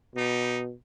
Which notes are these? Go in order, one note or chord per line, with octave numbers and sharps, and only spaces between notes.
B2 G3 D#4